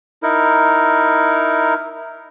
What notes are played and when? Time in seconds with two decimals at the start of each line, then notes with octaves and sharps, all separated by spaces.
0.23 D#4 E4 A#4